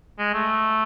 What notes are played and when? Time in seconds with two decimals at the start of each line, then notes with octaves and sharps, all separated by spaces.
0.19 G#3
0.34 A3